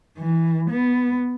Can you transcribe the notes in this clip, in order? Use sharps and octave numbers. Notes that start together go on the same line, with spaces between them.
E3
B3